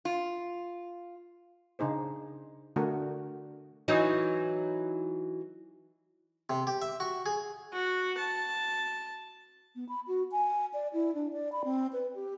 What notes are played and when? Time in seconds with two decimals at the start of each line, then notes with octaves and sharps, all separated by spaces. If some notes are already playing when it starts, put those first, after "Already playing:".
0.05 F4
1.79 C#3 D4 D#4 G#4 C5
2.76 D3 A3 D4 F#4 A#4
3.88 E3 F#3 D#4
6.50 C3
6.67 G4
6.82 E5
7.00 F#4
7.26 G#4
7.73 F#4
8.18 A5
9.76 B3
9.89 B5
10.08 F#4
10.32 G#5
10.74 D5
10.93 E4
11.15 D4
11.33 D5
11.52 B5
11.65 C4
11.93 B4
12.15 G4